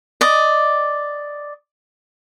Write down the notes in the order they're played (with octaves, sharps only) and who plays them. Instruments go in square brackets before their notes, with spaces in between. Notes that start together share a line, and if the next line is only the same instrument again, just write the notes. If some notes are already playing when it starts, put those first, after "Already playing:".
[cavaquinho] D5 D#5